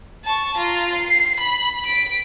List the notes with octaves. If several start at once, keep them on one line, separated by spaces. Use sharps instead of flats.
A5 C#6
F4 A#5
C7
B5
B6 D7